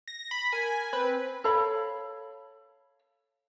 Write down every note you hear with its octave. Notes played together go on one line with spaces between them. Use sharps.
A#6
B5
A#4 G#5
C4 B4
A4 C#5 F5 B5